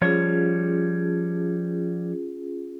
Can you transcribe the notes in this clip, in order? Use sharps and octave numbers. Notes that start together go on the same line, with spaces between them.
F3 G3 C#4 F4 G#4 C#5